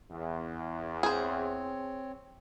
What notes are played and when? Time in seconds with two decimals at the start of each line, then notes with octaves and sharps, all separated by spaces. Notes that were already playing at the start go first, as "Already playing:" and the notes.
0.11 E2
1.03 C4 G#4 C5 C#5